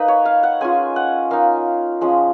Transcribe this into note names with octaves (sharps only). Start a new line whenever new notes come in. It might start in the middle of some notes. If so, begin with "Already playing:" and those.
Already playing: A#3 D#4 B4
C#5
F5
F#5
G#3 C#4 F4 G#5
F#5
A#3 D#4 F5
F3 G#3 C#4